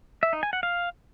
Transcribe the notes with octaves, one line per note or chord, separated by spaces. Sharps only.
E5
D#4
G#5
F#5
F5